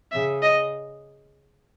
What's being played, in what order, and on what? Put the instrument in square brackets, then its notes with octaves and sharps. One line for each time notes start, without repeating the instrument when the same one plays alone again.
[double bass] C#3 [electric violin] E5
[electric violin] D#5